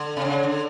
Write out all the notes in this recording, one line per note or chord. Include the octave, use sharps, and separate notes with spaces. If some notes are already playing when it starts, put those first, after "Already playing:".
Already playing: D3
C3
C#3
D3